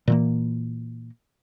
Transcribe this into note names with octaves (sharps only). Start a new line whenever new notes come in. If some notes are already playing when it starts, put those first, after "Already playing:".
A#2 E3 A#3